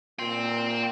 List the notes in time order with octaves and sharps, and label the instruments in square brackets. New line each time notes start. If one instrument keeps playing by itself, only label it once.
[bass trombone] A#2 [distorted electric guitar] G5 C6